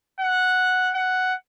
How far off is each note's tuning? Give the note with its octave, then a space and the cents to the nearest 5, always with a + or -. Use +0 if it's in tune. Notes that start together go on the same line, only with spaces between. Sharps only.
F#5 -5
F#5 +5